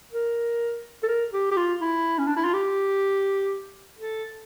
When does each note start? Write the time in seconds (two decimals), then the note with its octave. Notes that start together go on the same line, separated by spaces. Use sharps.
0.13 A#4
1.03 A4
1.08 A#4
1.33 G4
1.51 G4
1.57 F4
1.81 E4
2.18 C#4
2.27 D4
2.37 E4
2.45 F4
2.53 G4
3.98 A4